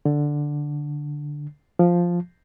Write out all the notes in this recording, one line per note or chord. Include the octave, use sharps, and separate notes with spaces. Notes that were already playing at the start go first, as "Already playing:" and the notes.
D3
F3